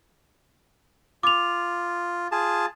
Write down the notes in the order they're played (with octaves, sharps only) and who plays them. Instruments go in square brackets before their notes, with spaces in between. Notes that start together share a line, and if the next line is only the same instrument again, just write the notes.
[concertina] F4 [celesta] D6 F7
[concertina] F4 G#4 A5